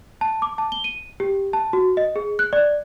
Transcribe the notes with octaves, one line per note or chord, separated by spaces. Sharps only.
A5
D6
A5
G7
D#7
G4
A5
F#4
D#5
G#4
F#6
D5